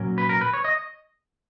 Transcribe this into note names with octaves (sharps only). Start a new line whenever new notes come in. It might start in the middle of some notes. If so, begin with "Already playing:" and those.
Already playing: A#2 F#3 A#3 C#4
B4
A#4
B4
C#5
D#5